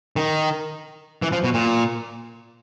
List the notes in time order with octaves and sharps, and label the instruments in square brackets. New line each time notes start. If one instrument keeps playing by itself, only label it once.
[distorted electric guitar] D#3
E3
F3
B2
A#2